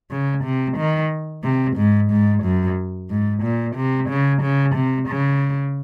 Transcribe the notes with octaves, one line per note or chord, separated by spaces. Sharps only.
C#3
C3
D#3
C3
G#2
G#2
F#2
G#2
A#2
C3
C#3
C#3
C3
C#3